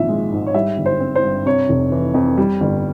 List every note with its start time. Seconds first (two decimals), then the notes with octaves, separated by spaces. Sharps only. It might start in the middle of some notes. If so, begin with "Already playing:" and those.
Already playing: G#1 A#2 F3 E5
0.09 G#3
0.32 G#2
0.46 C#5
0.54 G3 E5
0.78 G1
0.86 C5
1.00 C4
1.15 C5
1.24 G2
1.46 C3 C#5
1.69 F1
1.92 E3
2.14 F2
2.38 G3
2.61 G1